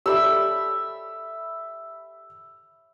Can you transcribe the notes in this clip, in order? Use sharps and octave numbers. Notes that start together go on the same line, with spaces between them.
G4 A4 D5 E5 B5 E6